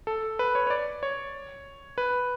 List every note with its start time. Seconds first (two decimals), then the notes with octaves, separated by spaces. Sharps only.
0.07 A4
0.39 B4
0.55 C#5
0.67 C#5
0.70 D5
1.03 C#5
1.98 B4